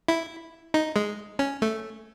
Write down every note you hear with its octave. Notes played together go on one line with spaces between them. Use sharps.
E4
D#4
G#3
C#4
A3